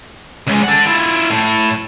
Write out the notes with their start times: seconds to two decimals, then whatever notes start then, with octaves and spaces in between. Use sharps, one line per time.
0.47 C#2 G#3
0.64 A4 F#5
0.87 E4 F4
1.30 A2